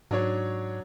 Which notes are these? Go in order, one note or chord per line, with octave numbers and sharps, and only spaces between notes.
G#2 F#3 D4 C#5